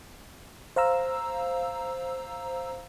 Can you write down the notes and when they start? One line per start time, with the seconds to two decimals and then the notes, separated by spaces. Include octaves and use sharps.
0.76 C5 F5 A#5 E6